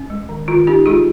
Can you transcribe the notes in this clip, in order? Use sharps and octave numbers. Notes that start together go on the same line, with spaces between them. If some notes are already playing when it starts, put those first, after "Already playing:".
Already playing: C#4
G#3
D#3
D#3 F4
C#4 D#4 G4
G#3 F4 G#4